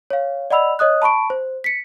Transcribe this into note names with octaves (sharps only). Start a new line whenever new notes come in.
C#5 F5
D5 D#5 F#5 B5 E6 F7
C#5 D#5 D#6 F#6
A5 B5 C#6 D7
C5
B6 C#7